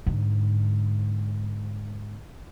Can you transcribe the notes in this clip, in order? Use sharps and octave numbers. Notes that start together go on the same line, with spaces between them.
G#2 D3